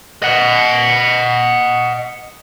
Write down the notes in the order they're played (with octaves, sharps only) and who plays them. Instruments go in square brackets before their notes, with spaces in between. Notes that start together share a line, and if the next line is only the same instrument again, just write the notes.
[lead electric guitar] D#5 F#5